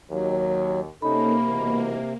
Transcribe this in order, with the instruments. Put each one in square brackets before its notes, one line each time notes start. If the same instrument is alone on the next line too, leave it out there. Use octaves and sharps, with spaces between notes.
[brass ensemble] D#2 [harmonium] F#3
[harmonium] C3 [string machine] A#3 [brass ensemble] C#4 D#4 A4 [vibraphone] B5
[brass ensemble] G#2 B2 E3